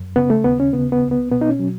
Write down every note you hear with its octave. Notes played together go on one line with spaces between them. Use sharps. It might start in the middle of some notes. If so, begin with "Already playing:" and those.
Already playing: F#2
C#3 B3
A3
D#2 B3
C#4
C#3 B3
B3
C#2
B3
B2 B3
D#4
C#4
F#3